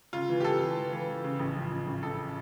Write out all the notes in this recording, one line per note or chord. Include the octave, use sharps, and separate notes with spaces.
C#3 F4
E3
G4
E3 A4
E3
E3
E3
E3
C#3
A1
F3
A1
A1
A1 A4